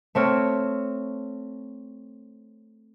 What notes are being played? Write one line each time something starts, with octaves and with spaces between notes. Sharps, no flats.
A3 C4 C#5 F6